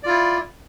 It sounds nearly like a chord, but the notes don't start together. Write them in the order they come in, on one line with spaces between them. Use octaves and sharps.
D5 F4 E4